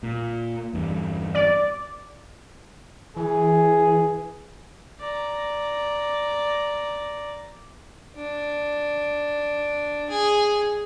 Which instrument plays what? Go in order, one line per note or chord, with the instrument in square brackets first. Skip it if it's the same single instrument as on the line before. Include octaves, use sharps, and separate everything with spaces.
[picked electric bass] A#2
E2 G2
[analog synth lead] D5
[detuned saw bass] E3 [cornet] G#4
[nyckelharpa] D5 A#5
[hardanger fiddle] D4
G#4